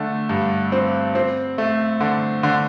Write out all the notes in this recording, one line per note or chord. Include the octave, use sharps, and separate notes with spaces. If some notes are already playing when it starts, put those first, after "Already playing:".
Already playing: D3 A3
G2
C4
C4
A3
D3
D3